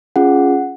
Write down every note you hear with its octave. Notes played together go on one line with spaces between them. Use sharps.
C#4 F4 G#4 F#5